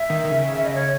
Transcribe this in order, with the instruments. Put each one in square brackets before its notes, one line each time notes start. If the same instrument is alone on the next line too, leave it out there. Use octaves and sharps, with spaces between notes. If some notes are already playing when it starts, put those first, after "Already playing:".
Already playing: [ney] E5
[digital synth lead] D#3
D#3
C#3
[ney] E5
D#5
C#5